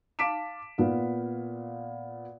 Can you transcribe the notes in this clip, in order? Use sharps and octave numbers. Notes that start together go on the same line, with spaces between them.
F5 A5 D6 B6 D7 E7
A#2 B3 F5